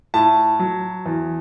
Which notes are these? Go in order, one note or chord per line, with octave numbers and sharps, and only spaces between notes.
A2 A5
F#3
E2